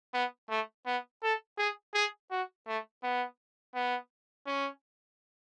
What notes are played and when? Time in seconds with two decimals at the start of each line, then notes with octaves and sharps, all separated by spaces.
0.14 B3
0.50 A3
0.86 B3
1.23 A4
1.58 G#4
1.94 G#4
2.31 F#4
2.67 A3
3.03 B3
3.75 B3
4.47 C#4